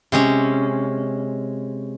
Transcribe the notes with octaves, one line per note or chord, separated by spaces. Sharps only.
C3 G#3 C#4